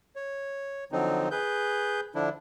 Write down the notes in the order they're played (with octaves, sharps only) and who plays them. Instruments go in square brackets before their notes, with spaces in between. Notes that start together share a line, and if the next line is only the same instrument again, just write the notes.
[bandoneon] C#5
D3 F3 F#3 C4 D#4
G#4 B4 G6
D3 F3 D4 E4